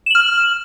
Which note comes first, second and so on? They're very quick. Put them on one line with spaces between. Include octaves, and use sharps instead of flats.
E7 F#7 F6